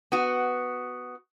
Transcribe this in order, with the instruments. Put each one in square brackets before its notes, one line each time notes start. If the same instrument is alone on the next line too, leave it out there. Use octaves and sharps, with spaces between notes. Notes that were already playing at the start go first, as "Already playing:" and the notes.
[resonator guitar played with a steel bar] B3 F#4